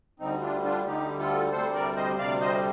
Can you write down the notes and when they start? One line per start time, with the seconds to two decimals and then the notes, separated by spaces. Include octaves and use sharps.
0.20 D2 D3 G3 C4 D#4
0.42 D4 F4
0.64 D4 F4
0.86 D2 D3 G3 D#4 G4
1.19 F4 A4
1.52 D2 C3 G3 A4 C5
1.74 A#4 D5
1.96 C5 D#5
2.18 D2 C3 G3 D5 F5
2.40 C5 D#5